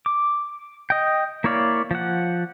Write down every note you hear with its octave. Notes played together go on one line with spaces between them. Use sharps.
D6
D#5 G5
A#3 E4 C#5 D5 F5
F3 F#5